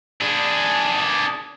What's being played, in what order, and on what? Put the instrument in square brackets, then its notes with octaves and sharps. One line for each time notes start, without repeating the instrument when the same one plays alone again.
[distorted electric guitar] D4 G#4